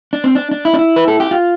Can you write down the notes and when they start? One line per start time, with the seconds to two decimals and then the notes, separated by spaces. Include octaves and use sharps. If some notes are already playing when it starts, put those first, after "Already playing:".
0.13 D4
0.24 C4
0.35 D4
0.51 D4
0.65 E4
0.74 D4
0.79 E4
0.96 B4
1.08 A4
1.20 G4
1.31 F4